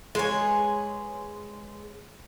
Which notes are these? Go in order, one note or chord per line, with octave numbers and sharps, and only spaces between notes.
G#3 G#4 B4 C#5 G#5